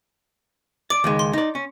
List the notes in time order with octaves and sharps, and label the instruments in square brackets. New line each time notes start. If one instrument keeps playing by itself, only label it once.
[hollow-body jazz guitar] D5 [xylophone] D6 D7
[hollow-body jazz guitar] C#2 D#3 G#3
[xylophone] C6
[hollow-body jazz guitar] D#4 D5
C#4